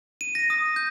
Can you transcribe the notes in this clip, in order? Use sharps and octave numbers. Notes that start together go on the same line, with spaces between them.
D#7
A#6
D#6
G6